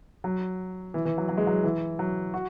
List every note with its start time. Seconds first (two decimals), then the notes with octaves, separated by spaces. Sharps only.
0.24 F#3
0.94 E3
1.05 E3
1.18 F#3
1.29 F#3
1.37 G#3
1.47 F#3
1.64 E3
1.99 F#3
2.34 F#4